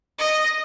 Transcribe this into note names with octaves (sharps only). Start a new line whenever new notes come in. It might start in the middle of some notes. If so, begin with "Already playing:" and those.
D#5